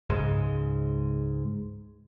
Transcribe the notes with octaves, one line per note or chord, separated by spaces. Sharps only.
C#2 G#2 G#3